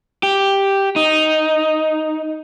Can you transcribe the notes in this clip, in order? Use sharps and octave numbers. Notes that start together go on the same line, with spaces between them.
G4
D#4